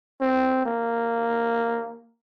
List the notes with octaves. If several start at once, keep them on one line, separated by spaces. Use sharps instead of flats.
C4
A#3